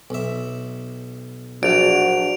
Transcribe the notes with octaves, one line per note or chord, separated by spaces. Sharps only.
B1 E5
A#1 F#3 D4 F#4 D7 F7